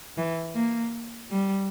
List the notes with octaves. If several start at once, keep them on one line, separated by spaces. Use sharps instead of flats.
E3
A#3
G3